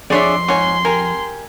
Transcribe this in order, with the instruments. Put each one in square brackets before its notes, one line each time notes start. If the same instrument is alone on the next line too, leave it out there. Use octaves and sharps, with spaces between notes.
[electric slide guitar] F2 [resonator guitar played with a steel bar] D4 D5 [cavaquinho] G#4 C#5 E5 [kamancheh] C6
[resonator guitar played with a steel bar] G#2 [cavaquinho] C#5 G#5
[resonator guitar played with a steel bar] G4 A#4 [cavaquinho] G#5